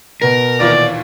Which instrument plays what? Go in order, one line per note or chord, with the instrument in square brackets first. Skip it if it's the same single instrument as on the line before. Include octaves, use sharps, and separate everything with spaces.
[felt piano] B2 B4 [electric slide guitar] A#4
[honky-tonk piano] D#2 A#2 E3 [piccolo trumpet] D5